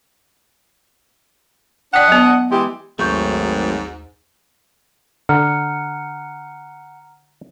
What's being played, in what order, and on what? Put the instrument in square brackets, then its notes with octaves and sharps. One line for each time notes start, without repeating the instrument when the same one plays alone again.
[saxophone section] D4 D#5 F#5 [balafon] D5 G5
[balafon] F#3 B3
[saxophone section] E3 G#3 G4
[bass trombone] G#1 [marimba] D#2 C#6 G6 [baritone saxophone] G#2 [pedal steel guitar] F#3 A3
[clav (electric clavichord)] D3 [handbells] F#5 [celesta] A#5 F6